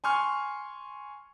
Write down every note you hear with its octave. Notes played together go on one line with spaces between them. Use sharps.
G#5 C6 C#6 F6